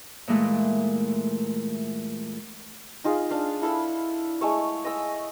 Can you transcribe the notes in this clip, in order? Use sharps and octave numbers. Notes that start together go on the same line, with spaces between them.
A#2 E3 G#3 A3
D#4 F4 G#4
D4 F5
E4 A4 F5 B5
G#3 A3 C#5
D#5 E6